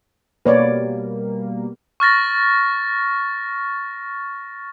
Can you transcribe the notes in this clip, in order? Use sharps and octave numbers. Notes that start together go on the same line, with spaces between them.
B2 G3 A#3 B4 C#5 D5
C#6 F6 A6 A#6